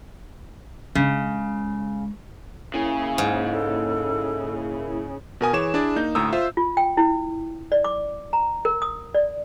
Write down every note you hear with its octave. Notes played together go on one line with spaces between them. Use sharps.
C#3 G#3
C#3 A#3 E4 G#5
G#2
A4
B2 A#4 G#5 D#6
E3 G#4 C#5 D6 E7
D4 E4 G#4 D5
A#3 D#4 G6
D2 A2 A#5 D#6 E6
F4 C5 E5
F4
G5
E4
D5
D6
A#5
A#4
D#6
D5